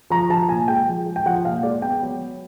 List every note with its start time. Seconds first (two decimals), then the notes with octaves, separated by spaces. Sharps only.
0.10 F3 A#5
0.30 F3 A5
0.49 A#2 G#5
0.68 G#3 G5
0.88 F3
1.06 G#3
1.16 G5
1.26 F3 F#5
1.45 A#2 F5
1.63 G#3 D5
1.82 B3 G5
2.02 F#3
2.21 F#3